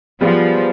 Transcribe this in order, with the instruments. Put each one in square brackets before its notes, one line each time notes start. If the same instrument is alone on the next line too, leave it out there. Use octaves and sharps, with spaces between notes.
[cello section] F3 [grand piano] G3 B3 F4 G#4